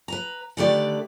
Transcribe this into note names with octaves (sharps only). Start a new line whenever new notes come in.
B4 A#5
D3 D#3 A3 G4 B4 D5